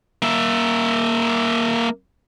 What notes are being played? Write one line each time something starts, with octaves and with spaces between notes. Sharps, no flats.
A#3 E5